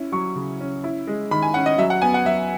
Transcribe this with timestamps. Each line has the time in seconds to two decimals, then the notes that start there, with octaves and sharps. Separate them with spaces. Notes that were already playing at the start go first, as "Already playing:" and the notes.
Already playing: C#4 E4
0.12 F#3 C#6
0.35 C#3
0.60 C#4
0.84 E4
1.07 G#3
1.31 D#3 B5
1.42 G#5
1.54 C#4 F#5
1.66 D#5
1.78 F#3 E5
1.90 F#5
2.02 B3 G#5
2.14 F#5
2.25 F#3 E5